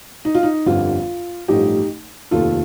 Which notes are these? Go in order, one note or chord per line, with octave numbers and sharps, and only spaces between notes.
D#4
F4
D#4
G1 F2 D3 G3 F4
A1 G2 F3 A3 D#4 G4
F1 D#2 D#3 F4 A4